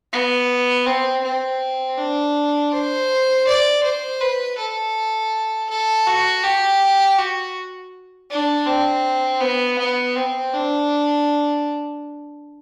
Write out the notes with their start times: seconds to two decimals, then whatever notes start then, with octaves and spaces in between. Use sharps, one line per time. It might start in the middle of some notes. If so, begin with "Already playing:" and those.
0.13 B3
0.86 C4
1.23 C4
1.98 D4
2.72 C5
3.47 D5
3.83 C5
4.21 B4
4.58 A4
5.69 A4
6.07 F#4
6.44 G4
7.18 F#4
8.30 D4
8.66 C4
9.41 B3
9.78 B3
10.16 C4
10.53 D4